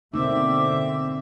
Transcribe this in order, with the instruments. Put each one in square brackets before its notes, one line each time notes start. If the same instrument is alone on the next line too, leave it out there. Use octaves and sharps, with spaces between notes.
[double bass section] B2 D3 C4 [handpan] A3 A#3 D#4 [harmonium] E5 [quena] D6